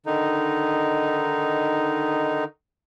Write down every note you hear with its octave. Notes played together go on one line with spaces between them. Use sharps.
D3 D#3 D#4